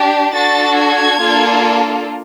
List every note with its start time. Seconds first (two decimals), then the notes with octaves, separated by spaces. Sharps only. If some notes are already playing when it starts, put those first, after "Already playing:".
Already playing: D4 G4
0.33 D4 F#4 A4 A6
0.75 G#6
1.19 A#3 D4 F4 A4